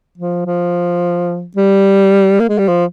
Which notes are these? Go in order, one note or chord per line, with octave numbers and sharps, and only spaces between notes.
F3
F3
G3
A#3
G#3
G3
F3